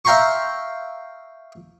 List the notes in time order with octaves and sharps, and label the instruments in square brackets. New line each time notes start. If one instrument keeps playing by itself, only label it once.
[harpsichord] E5 F5 G5 A#5 C6 C#6